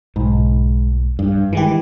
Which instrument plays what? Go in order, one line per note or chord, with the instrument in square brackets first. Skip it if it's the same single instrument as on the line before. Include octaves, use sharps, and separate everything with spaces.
[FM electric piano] B1 [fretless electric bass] G#2
[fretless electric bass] G2
[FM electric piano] D#3 G#3 G4 [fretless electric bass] E3